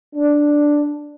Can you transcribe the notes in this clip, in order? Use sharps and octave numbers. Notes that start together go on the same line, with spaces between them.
D4